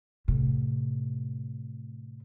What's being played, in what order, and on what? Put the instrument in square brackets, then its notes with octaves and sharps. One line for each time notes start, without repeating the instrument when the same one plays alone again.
[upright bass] A2 C3